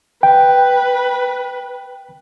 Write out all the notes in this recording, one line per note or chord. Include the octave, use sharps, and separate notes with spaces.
B4 G5